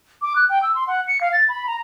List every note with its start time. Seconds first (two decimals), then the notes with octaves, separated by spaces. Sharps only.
0.22 D6
0.36 F#6
0.49 G5
0.63 E6
0.75 C6
0.87 F#5
1.07 C#7
1.21 F5
1.33 A6
1.49 B5
1.67 A#5